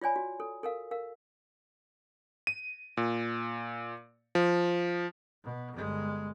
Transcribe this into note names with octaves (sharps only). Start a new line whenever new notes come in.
F4 C#5 D5 G#5 B5
F#4
A4
A4 A#4 F5
A#4 F5
D#7
A#2
F3
B2
G1 G#3